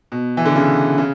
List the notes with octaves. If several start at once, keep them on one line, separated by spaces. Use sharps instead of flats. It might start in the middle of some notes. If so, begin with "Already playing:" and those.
B2
E3
D3
C#3
C#3